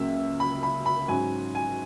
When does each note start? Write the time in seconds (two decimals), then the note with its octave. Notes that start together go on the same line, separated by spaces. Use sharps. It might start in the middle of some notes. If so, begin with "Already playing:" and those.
Already playing: C#2 C#3 F#3 A#3 C#4 E5
0.40 B5
0.63 B5
0.86 B5
1.08 G#2 F#3 C#4 G#5
1.55 G#5